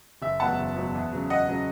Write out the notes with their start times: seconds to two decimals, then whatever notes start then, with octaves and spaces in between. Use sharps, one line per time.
0.22 F#1 E5
0.40 E2 B2 F#3 F#5 A5
0.59 F#1
0.76 E2 B2 F#3
0.95 E2
1.13 C#3 F#3
1.30 E2 D#5 F#5
1.48 C#3 F#3